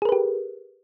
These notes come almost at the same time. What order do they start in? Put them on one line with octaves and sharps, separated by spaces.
G#4 A#4 B4 G4